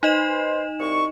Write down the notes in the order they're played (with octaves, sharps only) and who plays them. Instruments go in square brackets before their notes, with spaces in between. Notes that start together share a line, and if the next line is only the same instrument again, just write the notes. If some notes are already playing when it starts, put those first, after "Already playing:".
[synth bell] D#4 D#5 E7 [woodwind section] B4 C5
[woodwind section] C2 C#6